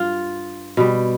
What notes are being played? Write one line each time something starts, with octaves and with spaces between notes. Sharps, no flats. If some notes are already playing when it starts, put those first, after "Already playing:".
Already playing: G2 F4
B2 G3